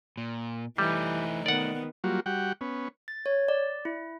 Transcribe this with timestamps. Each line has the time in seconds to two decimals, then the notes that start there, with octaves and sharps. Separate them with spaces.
0.17 A#2
0.78 E3 G3 A3 D#4
1.46 D#3 B3 D5 F#5
2.04 F#3 G3 A#3 F4 F#4
2.26 G3 F#4 F#5 G5
2.61 B3 C#4
3.08 A6
3.26 C#5
3.48 D5
3.85 E4